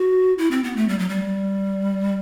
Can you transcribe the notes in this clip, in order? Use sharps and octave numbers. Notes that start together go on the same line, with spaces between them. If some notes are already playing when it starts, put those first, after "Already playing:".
Already playing: F#4
E4
C4
B3
A3
G3
F#3
G3